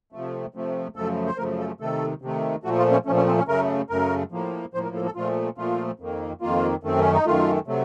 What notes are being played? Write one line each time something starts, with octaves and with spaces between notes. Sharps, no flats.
C3 F3 A3
C3 F3 A3
F#2 C#3 F3 A3 A4
C5
F#2 C#3 F3 A3 A#4
A4
C3 D#3 A3 A4
C3 D#3 A3
A#2 F3 A3 F#4
F4
C#4
A#2 F3 A3 C#4
C#4
C4
C#4
F#2 C#3 A3 A#4
F#2 C#3 A3 A#4
A2 F3 A#3
A2 F3 A#3 C5
A#4
A4
A4
A#2 F3 A3 F4
A#2 F3 A3 F4
F2 D#3 A#3
F2 D#3 A#3 F4
F#2 D#3 A3 C4
C#4
D#4
F#2 D#3 A3 F4
C3 F#3 A3